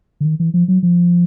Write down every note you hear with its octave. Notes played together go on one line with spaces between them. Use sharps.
D3
D#3
E3
F3
F#3
F3